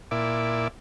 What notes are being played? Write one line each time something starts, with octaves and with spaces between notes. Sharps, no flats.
A#2 E4 D5